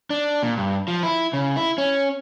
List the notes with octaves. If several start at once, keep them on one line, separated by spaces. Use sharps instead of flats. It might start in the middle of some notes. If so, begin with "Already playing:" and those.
D4
A#2
G2
F3
E4
C#3
E4
C#4